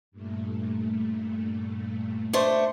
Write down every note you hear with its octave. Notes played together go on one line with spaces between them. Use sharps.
G2 A#2 A3
A3 D4 C5